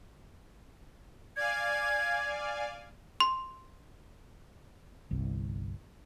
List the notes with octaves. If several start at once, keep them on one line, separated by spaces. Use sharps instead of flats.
D5 F5 G#5 G#6
C6
G1 C2